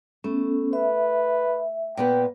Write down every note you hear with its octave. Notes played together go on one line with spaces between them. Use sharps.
A3 B3 C#4
B4 E5
A#2 B3 B4 G5